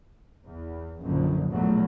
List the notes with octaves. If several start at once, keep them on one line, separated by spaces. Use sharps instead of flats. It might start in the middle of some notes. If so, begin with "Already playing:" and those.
E2
A#1 F#2 D3 D#3
A#1 E2 B2 F#3 A3